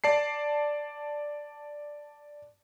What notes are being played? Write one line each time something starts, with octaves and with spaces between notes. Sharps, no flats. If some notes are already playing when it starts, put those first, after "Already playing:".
D5 A5 C7